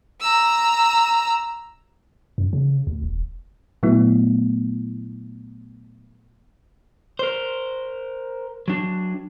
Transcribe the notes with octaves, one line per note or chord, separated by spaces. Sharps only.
A#5 E6
F#2
C#3
D2
E1
A#2 F#3 A3 B3 E4
A#4 C5
F#3 D4